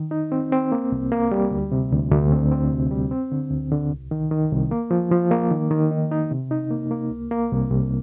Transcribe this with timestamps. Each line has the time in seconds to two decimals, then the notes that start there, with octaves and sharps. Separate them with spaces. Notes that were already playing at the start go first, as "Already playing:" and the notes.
Already playing: D#3
0.11 D#4
0.32 C4
0.52 C4
0.72 A#3
0.92 C2
1.12 A#3
1.31 G3
1.51 D2
1.72 C3
1.91 D2
2.11 D2
2.32 C4
2.51 C4
2.72 C3
2.91 G3
3.11 C4
3.32 D3
3.51 D2
3.72 D3
3.91 C2
4.11 D#3
4.31 D#3
4.51 C2
4.71 A#3
4.91 F3
5.11 F3
5.31 A#3
5.51 D#3
5.71 D#3
5.91 D#4
6.11 D#4
6.31 C3
6.51 D#4
6.71 A#3
6.91 A#3
7.11 C2
7.31 A#3
7.51 C2
7.71 C2